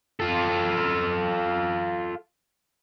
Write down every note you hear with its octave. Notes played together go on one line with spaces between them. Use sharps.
F4 A4